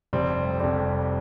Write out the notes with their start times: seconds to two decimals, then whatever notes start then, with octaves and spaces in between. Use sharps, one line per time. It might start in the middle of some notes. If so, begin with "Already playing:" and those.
0.13 F1 F2 C3 G3 C4
0.60 F1 F2 C3 G3 C4